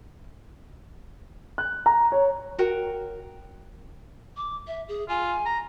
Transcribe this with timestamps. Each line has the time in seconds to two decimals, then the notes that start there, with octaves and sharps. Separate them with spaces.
1.58 F#6
1.86 A#5
2.12 C#5
2.58 F#4 A#4 G5
4.37 D6
4.68 E5
4.88 G#4
5.09 F4 G#5
5.46 A#5